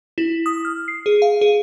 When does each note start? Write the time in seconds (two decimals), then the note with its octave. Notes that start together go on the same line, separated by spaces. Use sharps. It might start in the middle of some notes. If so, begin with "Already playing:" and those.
0.18 E4
0.46 D#6
0.65 F6
0.88 C7
1.06 G#4
1.22 F5
1.41 G#4